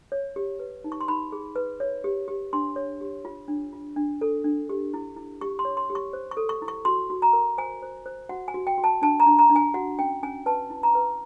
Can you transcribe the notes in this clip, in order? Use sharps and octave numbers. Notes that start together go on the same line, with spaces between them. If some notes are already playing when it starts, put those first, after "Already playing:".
C#5
G4
B4
D#4
C#6
C6
D#4 B5
G#4
B4
C#5
G4
G4
D4 C6
C#5
G4
F4
D4
F4
D4
A4
D4
G4
E4
E4
G4 C#6
C6
C#5
C6
G4
C#6
C5
C#6
A4
C#6
E4
C#6
F#4 C6
F#4
A#5
A#4
C5 G#5
C5
C5
F#4 F#5
G#5
F#4
G5
F#4
A5
D4 A5
A#5
D4
A#5
D4
G#5
F#4 F#5
C#4 G5
C#4 G#5
B4 A5
E4
A#5
B4